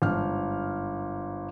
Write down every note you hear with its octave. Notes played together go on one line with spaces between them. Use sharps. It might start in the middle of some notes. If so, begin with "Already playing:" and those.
G1 G#2 F6